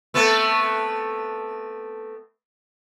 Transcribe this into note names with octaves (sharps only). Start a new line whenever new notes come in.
A3 B3 C4